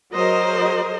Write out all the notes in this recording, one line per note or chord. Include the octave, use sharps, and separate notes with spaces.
F#3 G#4 A#4 C5 D#5